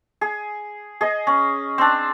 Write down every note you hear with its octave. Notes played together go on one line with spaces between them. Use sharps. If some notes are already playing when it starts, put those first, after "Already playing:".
G#4
G#4 D#5
C#4
C4 D4